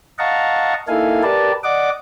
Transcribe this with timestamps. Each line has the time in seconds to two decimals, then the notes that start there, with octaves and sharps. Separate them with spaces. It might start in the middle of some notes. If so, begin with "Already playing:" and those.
0.19 D#5 F5 F#5 A5 A#5 C#6
0.88 A#3 D#4 E4 A4 F5 G#5
1.23 G4 A#4 B4 D5 A5
1.64 D5 D#5 F#5 D6